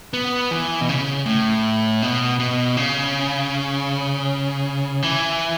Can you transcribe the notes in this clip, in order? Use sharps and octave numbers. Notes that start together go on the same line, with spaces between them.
B3
E3
B2
C#3
A2
B2
B2
C#3
E3